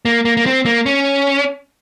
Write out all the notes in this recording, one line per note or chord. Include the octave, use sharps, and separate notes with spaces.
A#3
A#3
A#3
C4
A#3
C#4